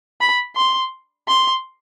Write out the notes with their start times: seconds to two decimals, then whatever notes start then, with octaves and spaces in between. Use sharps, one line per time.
0.21 B5
0.56 C6
1.28 C6